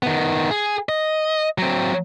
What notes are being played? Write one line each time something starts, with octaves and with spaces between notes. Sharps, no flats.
D#3 B3
G#4
D#5
F#3 C4